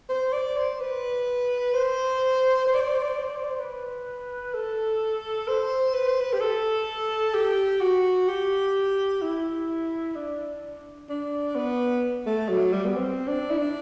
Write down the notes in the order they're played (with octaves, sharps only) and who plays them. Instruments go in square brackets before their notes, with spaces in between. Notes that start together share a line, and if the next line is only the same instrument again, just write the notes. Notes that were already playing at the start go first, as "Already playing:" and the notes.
[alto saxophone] C5
D5
C5
B4
C5
C5
D5
C5
D5
C5
D5
C5
D5
C5
D5
C5
D5
C5
B4
A4
C5
B4
C5
B4
G4
A4
G4
F#4
G4
E4
D4
D4
B3
A3
F#3
G3
B3
C4
D4
E4
D4